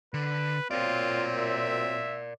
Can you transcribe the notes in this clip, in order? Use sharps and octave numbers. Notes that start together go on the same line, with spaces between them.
D3 B4
A#2 F#3 C4 F4 A#4 D5
E5